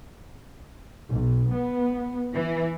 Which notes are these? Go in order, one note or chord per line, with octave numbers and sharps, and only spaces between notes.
B1
B3
E3